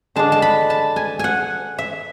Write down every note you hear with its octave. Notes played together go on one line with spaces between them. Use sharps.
D3 G#3 D4 A5
A5
B5
A5
G#5
F#5 G#5
E5